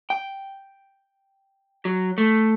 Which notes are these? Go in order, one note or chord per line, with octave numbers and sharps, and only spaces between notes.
G5
F#3
A3